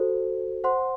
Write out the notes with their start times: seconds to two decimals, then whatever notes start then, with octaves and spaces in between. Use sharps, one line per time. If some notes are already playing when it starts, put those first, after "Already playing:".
Already playing: F#4 A4 C5
0.64 C5 F#5 C6